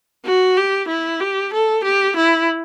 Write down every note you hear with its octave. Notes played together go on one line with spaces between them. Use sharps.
F#4
G4
E4
G4
A4
G4
E4